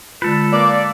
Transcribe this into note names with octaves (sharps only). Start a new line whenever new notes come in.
D3 G#3 F4 A4 B4
A#3 D5